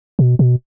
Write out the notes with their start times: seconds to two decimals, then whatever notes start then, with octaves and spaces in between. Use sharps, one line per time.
0.19 B2
0.39 B2